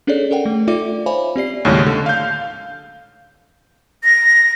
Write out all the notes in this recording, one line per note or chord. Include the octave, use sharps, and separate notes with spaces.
C#4 D4 G#4 A4 C#5 D5
A4 A#4 F#5 G5
A3
D#4 F4 A4 D5 E5 D6
C5 C#5 E5 F5 G#5 B5
C4 G4 D5 C7
D#2 A2 C#3 F#3 G#3 C#4
D3
F5 G6
A#6